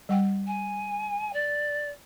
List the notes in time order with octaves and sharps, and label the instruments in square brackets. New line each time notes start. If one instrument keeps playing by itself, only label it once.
[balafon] G3 F#5 G5
[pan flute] G#5
D5